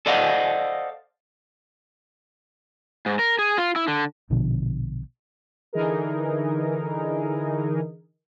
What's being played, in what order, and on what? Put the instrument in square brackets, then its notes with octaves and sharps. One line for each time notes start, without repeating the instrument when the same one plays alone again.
[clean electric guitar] A4 C5 D5 D#5 F5 F#5
[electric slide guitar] G#2
A#4
G#4
F4
E4
D3
[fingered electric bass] A#1 B2 D3 F3
[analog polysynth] D3 E3 D#4 G#4 A#4